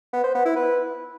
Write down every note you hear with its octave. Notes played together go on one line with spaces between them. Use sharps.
B3
C5
B3
E4
B4